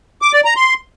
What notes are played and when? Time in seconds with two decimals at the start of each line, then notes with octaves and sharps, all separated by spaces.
0.22 D6
0.33 D5
0.45 A#5
0.56 C6